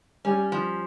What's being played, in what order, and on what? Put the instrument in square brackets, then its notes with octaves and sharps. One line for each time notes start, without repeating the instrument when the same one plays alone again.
[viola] G3 [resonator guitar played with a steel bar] C#4
[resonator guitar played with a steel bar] F3